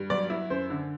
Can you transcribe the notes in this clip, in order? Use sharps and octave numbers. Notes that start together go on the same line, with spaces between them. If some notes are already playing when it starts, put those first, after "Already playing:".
Already playing: G2
F#3 D5
E4
F#2 C5
D3